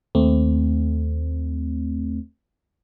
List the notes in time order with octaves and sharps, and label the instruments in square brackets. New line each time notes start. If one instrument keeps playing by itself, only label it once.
[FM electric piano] D#2 A3 C4